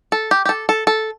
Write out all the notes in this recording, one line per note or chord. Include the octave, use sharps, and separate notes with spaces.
A4
G4
G4
A4
A4
A4